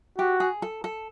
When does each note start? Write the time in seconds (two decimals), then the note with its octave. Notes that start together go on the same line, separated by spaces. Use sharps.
0.18 F#4 G4
0.40 G#4
0.62 A4
0.84 A4